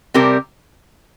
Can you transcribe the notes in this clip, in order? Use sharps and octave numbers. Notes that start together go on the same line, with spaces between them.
C3 G3 C4 G4 A#4